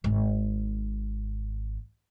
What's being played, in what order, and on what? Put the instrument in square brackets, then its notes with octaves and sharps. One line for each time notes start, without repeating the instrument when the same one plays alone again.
[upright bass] G#1 D#3